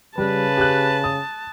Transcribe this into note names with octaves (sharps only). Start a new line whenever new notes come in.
C#3 G3 B4 A5
G4 F#6
D#6